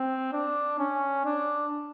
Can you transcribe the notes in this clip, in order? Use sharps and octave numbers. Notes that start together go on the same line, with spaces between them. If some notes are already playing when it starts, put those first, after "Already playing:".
Already playing: C4
D4
C#4
D4